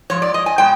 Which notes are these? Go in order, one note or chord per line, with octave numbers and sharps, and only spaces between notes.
G#2 F3 C#5
D5
D#5
G#5
B2 G#3 G5